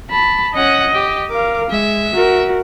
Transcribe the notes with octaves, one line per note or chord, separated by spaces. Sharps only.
A5 B5
C#4 D#5 F#5
G4
A#4 F5 D6
G#3 E5
F#4 A#4